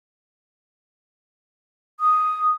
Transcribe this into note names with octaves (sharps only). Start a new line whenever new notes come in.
D#6